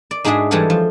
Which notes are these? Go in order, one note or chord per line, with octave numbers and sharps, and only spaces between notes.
D5
G#2 G#3 D4 F#4 G#4 E5
E3 G3 G#3 A4 C#5 F#5
F3